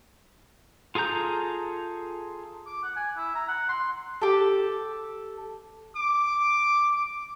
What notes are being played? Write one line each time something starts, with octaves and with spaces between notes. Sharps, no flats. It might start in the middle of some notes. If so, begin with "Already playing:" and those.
F4 G#4 A4 A#5 G6
D6
F#5
G#5
E4
A#5
F#5
C6
G4 A4
D6